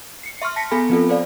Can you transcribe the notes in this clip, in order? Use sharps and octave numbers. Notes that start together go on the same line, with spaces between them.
C7 C#7
E5 C6 C#6 F6
A5 A#6 B6 C#7
B3 G#4 A4 G#5 B5
F3 C4 F4 A4
A4 C5 D5 F5